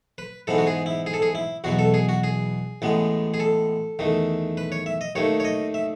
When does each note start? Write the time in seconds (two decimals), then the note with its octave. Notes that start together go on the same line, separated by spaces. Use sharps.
0.18 B4
0.47 G#2 E3 B3 A4
0.58 F#4
0.67 G#4
0.86 E4
1.06 G#4
1.14 A4
1.22 G#4
1.35 E4
1.64 E2 B2 F#3 F#4
1.79 A4
1.94 G#4
2.09 F#4
2.24 G#4
2.82 A1 A2 G#3 B3
3.34 G#4
3.40 A4
3.99 E2 D#3 A3
4.57 B4
4.72 C#5
4.86 E5
5.01 D#5
5.15 D#2 D#3 A3 C#5
5.40 C#5
5.45 D#5
5.74 E5